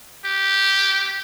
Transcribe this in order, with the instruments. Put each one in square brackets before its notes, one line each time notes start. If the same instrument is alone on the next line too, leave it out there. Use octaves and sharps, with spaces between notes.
[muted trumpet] G4